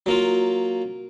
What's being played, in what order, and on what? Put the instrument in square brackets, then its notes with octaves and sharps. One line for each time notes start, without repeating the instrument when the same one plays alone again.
[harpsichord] F#3 A#3 F4